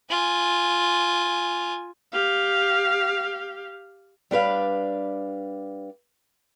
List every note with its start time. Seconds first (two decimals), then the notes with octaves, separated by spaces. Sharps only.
0.10 F4 G#5
2.12 G4 F5
4.31 G3 D4 B4 F5